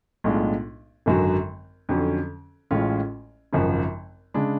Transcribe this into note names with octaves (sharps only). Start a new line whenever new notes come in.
B1 A2 G#3 D4 F4
G#1 F#2 D3 F#3
F2 D3 F#3 C#4
A1 A2 G#3 C#4 F4
G#1 F#2 C#3 F3
C#3 G#3 D4